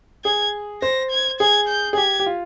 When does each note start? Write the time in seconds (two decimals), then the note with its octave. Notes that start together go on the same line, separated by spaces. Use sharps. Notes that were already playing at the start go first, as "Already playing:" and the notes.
0.25 G#4 G#6
0.82 C5 A#6
1.11 G#6
1.40 G#4 G#6
1.68 G6
1.93 G#4
1.97 G4 G#6
2.20 G4
2.26 F4